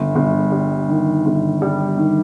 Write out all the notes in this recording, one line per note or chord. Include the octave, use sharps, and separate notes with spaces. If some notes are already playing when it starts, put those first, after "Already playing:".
Already playing: G1
G1
G3
D#3
G1
G3
D#3